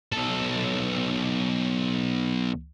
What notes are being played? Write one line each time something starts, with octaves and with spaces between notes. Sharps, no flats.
B1 A4